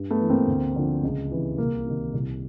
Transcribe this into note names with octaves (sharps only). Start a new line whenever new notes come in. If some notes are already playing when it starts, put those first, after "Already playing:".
Already playing: G2
A3 B3
E3
A#3 C4
D2
D3 F3
C#2
C3 E3
C2 A#3
C3 D#3
C2